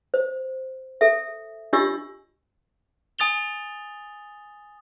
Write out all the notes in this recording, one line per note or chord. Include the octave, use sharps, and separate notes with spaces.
C5
A4 E5
D4 F4 G4 D#5 C#6 E6
G#5 D#6 A6 F7 G7